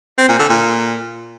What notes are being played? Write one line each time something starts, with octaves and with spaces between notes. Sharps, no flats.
C4
A#2
D3
A#2